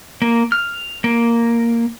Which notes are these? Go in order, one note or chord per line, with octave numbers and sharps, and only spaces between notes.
A#3
F6
A#3